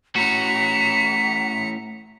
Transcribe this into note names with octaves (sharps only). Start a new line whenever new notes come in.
A2 C#4 F#4 A#5 B6 C#7